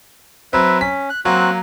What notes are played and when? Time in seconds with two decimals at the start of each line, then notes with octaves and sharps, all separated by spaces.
0.53 F#3 C4 B4 E5
0.81 C#4 B6
1.10 F#6
1.25 F#3 A#3 C4 F#4 F#6